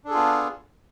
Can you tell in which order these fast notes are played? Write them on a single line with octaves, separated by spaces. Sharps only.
D4 A4 G#4 F4 B3